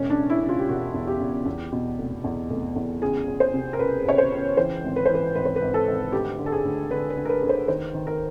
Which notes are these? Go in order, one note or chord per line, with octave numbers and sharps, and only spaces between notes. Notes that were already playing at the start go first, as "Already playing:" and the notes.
Already playing: E1 C#4
D4
C#3
E4
C#3
F4
G4
E1 F#4
E2
G4
E2
E2
B2
F1
E2
F1
E2
C#2 G#4
C#2
C5
C3
A#4
C#2 B4
C#2 C#5
C5
C#2
E3 C5
G#1
B4
E3 C5
B4
G#1 B4
C5
B4
G#1
A4
G#1
D2 G4
D3
A4
G#4
D2
D3 B4
B4
D3
A#4
B4
D2
C5
D#3 C5
D#3
A#4